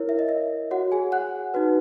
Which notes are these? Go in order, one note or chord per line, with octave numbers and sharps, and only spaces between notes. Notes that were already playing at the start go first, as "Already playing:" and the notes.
Already playing: E4 A#4 C#5
E5
D#5
E5
F#4 C#5 F#5
G#4 G#5
F#5 F#6
D#4 F#4 B4